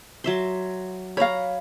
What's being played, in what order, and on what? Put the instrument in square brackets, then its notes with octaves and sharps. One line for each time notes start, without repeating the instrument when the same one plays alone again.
[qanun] F#3 E5 C6
[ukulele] C#5 F5 [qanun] A#5 B5